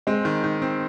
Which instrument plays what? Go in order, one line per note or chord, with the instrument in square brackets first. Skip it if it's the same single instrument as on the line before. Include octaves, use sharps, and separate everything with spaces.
[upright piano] G#3 [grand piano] C4
[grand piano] D#3
D#3
C4